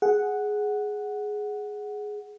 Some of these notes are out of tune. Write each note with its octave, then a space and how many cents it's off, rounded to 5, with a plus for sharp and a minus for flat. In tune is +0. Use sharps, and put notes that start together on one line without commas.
G#4 +10 F#5 +0